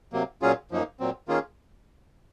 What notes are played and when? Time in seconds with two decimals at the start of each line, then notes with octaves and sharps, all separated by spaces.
0.13 C3 F#3 A#3
0.42 A#2 F#3 C#4 F4 G#4
0.71 F#2 F3 A#3 D#4
1.00 A#2 F#3 C4
1.28 D#3 A#3 C#4 F4 G#4